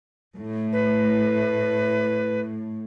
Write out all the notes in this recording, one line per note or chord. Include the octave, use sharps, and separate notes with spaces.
A2
B4